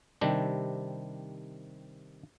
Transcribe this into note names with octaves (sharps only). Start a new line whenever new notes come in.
C3 D#3 G3 C4 D4